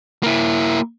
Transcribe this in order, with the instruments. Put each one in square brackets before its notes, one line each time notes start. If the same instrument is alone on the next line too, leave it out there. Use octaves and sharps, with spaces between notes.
[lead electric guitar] A#3 E4